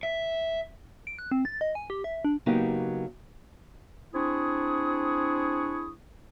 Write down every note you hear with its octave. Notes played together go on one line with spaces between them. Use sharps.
E5
D7
F#6
C4
A6
D#5
G#5
G4
E5
D4
C#3 F#3 A#3 B3 D#4 G4
C4 D4 E4 G#4 C#6 D#6